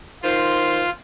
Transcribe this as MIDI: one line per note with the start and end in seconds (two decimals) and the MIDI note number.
0.23 0.85 51
0.23 0.90 65
0.23 0.85 72